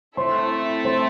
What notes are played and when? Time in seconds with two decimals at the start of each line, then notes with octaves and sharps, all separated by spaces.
0.17 A3 C4 E4 A4 C5 E5 C6
0.85 C5 C6